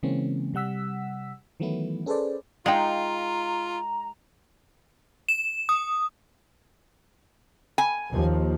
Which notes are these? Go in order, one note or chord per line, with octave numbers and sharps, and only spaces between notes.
C#3 E3 G#3 A#3 C4 C#4
C3 G3 F#5 E6 B6
D#3 E3 F#3 A3 B3 E4
C#4 G#4 A4 B4 C5 D5
G#3 D#4 F4 F5 G5 A#5
E7
D#6
G#5
D#2 F3